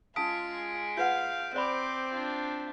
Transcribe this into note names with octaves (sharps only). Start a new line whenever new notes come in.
G#3 C#4 F4 G#4 A5 D#6 B6 D7
F4 B4 F5 F#5 G6
C4 C5 D5 B5 C6 D6
D4 F4